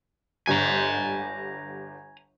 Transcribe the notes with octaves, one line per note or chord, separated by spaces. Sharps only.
G1 D3 G3 G#5 A#5